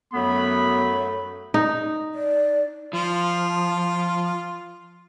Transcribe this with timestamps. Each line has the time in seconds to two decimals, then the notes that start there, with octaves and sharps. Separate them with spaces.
0.13 F#2 F#3 A3 B3 B5
1.54 D#4
2.14 D5
2.93 F3 F4